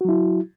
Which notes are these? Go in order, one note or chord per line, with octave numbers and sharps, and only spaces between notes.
F#3 E4 F#4